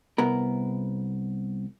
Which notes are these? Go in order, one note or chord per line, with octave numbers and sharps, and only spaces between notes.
C2 B3 A#4